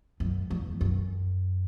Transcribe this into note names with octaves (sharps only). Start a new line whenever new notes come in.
F#2
E2
F#2